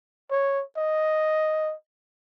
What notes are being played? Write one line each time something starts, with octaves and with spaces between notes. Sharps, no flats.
C#5
D#5